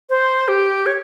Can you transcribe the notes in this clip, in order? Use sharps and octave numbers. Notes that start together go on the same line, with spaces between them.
C5
G4
C#5